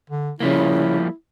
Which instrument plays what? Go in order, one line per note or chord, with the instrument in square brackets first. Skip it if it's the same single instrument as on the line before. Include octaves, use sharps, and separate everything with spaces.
[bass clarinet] D3
[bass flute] C#3 [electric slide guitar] F3 G3 A#3 [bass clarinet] E4